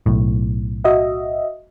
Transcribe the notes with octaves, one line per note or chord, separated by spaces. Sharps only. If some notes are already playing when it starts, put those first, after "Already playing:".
B1 A2
F#4 D#5 E5